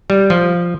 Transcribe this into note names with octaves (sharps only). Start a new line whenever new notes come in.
G3
F3